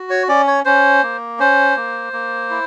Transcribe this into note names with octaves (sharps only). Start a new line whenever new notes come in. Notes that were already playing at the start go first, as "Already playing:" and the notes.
Already playing: F#4
C#5
C#4 D5
C#5
C#4 C5
A#3
C#4 C5
A#3
A#3
E4